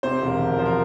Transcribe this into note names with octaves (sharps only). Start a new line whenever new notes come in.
C3 C5
E1
A#4
D2
A#4
F3 C5
A#4